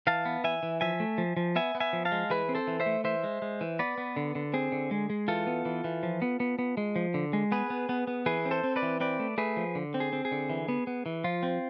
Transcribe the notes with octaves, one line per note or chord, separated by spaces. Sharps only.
E3 F5 A5
B3
E3 E5 G#5
E3
F3 E5 G#5
A3
F3
F3
B3 E5 G#5
B3
E5 G#5
F3
F5 A5
G#3
E3 G#4 B4
C4
A4 C5
E3
C5 E5
A3
E3 C5 E5
G#3
G#3
E3
B3 B4 D5
B3
D3
D3
C4 G#4
D3
G#3
G#3
E3 F4 A4
B3
E3
E3
F3
B3
B3
B3
G#3
F3
D3
G#3
B3 G#4 B4
B3
B3
B3
E3 G#4 B4
C4
A4 C5
C4
B4 D5
E3
C4 B4 D5
A3
A3 G#4 B4
F3
D3
C4
G#4
C4
G#4
D3
E3
B3
B3
E3
F3 F4
C4